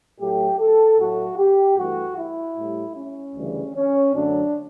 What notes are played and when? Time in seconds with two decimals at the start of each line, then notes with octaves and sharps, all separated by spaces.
0.20 A2 F#3 A3 G4
0.59 A4
0.99 A2 F#3 A3 F#4
1.38 G4
1.78 G2 E3 A3 F#4
2.17 E4
2.57 A2 G3
2.96 C#4
3.35 D2 C#3 E3 G3
3.75 C#4
4.14 F#2 D3 F#3 A3 D4